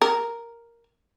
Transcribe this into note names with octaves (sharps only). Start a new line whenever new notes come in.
A#4